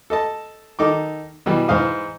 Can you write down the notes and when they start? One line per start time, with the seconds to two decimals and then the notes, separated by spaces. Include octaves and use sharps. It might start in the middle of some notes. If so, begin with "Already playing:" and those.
0.10 A4 D#5 A5
0.79 D#3 D#4 A4 D6
1.46 B2 E3 G3
1.68 G#2 E3 C5 F5 D#6